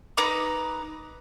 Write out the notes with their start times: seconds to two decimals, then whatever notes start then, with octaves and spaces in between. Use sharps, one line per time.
0.17 D#4 B4 A#5 D6